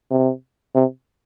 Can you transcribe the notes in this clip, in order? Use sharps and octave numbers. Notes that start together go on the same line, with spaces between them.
C3
C3